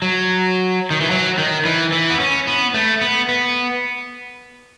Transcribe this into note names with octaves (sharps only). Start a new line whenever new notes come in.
F#3
D#3
E3
F#3
D#3
E3
E3
B3
C#4
B3
A3
B3
B3